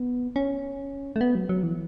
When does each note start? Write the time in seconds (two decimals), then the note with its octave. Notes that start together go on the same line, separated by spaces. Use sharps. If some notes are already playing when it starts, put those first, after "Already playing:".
Already playing: B3
0.36 C#4
1.16 A3
1.21 B3
1.35 F#3
1.49 F#3
1.63 E3